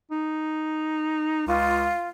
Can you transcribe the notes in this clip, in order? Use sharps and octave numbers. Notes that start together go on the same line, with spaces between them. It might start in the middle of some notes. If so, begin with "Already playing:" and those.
D#4
C#2 F4